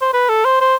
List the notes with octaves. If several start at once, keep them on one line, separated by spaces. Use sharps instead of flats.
C5
B4
A4
C5
C5